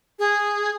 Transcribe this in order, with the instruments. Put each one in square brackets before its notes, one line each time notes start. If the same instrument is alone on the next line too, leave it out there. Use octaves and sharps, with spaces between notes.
[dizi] G#4